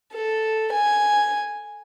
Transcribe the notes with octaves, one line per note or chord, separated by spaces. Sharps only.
A4
G#5